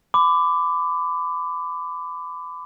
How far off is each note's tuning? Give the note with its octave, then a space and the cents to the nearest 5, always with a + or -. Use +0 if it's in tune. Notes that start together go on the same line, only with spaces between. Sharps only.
B5 +30 D6 +0